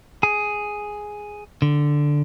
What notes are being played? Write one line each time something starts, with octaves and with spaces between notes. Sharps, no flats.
G#4
D3